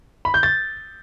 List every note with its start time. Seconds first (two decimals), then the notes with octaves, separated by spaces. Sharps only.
0.25 B5
0.34 G6
0.43 A6